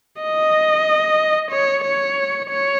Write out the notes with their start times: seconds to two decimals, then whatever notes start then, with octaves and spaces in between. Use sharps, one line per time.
0.22 D#5
1.51 C#5
1.84 C#5
2.49 C#5